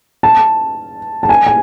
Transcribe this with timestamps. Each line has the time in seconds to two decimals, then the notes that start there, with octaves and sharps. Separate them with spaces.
0.23 A5
1.23 A5
1.29 G#5
1.47 G#5